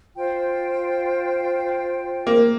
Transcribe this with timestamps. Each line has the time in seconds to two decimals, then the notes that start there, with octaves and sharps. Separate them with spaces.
0.15 F4 C5 G5
2.27 A#3